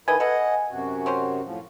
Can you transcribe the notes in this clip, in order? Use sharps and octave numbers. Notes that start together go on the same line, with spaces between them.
D3 D#3 E4 B4 D#5 G#5
A4 B4 D#5 F#5
F#2 C3 F#4
C4 C#4 C5
A2 F3